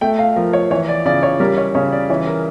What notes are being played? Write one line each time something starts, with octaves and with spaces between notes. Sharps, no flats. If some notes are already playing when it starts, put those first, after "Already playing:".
A3 G5
F5
F3 A#4
C#5
E3 C#5
D5
C#3 D5
C#5
G3 A#4
C#5
C#3 C#5
D5
E3 C#5
A#4